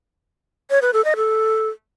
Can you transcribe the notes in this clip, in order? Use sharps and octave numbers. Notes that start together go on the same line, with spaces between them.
C#5
B4
A4
D#5
A4